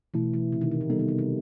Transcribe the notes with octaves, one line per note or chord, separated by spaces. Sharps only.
B2 E3 A3 E4
E3
C3
D#3
C3
B2
C3 G3 B3 D#4 A4
D#3
C3
C3